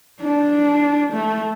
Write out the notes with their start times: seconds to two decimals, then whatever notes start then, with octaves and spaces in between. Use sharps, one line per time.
0.21 D4
1.13 A3